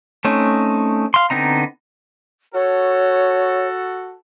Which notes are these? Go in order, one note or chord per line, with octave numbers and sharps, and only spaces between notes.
A3 C4 C#4 D#4
F5 C6
D3 B3 C4 D#4 A#5
F#4 A4 C#5